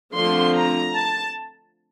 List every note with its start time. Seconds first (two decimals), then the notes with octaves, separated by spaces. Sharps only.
0.15 D3 F3 A3 C4 C6
0.55 A#5
0.95 A5